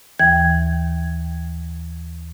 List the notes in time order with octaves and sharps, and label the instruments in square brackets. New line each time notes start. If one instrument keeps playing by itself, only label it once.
[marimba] D#2 E3 G5 G#6